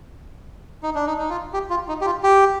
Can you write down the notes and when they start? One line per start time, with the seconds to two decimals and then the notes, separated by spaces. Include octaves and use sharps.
0.83 D#4
0.95 D4
1.06 D#4
1.19 D#4
1.30 F4
1.53 G4
1.70 F4
1.88 D#4
2.01 G4
2.06 F4
2.23 G4